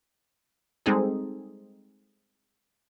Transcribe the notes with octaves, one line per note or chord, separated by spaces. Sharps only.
G3 G#3 C4 D#4 G#4 A4